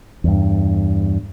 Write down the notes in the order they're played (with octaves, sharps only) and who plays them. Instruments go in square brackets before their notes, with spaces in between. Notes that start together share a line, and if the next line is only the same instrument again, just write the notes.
[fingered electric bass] E2 G2